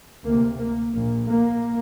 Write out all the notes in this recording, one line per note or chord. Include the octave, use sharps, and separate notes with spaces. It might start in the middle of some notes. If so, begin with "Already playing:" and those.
D2 C3 A#3
A#3
A#1 A#2 A#3
A#3